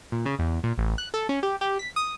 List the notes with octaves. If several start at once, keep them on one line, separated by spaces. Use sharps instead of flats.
A#2
C#3
E2
A#2
A1
F#6
A4
C#4
G4
G4
B6
D#6